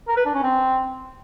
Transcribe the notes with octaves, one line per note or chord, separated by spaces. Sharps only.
A#4
B4
D4
C#4
C4